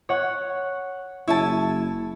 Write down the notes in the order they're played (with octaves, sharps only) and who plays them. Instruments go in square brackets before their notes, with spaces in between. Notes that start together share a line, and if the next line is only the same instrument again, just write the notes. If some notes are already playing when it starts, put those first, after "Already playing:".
[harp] C#5 F#5
[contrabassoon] F#1 [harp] E4 [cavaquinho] C#5 G#5 A5